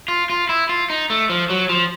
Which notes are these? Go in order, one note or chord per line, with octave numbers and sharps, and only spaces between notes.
F4
F4
E4
F4
D#4
A3
F3
F#3
F3